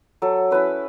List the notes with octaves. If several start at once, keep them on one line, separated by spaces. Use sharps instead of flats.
F#3 A4
C#4 E4 B4